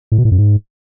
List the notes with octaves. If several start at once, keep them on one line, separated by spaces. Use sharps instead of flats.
A2
B2
A2
F#2
G#2